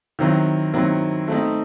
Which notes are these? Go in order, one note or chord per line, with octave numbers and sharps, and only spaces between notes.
D#3 F#3 C4 E4
D#3 F#3 C4 E4
A3 C4 D#4